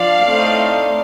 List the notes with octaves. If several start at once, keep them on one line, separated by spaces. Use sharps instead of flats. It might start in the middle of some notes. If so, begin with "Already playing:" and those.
Already playing: F3 D4 D5 F5
A2 A3 C4 D#4